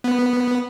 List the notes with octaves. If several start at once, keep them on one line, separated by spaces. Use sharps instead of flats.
B3